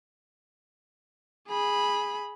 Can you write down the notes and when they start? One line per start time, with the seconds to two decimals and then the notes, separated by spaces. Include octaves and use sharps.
1.49 G#4 B5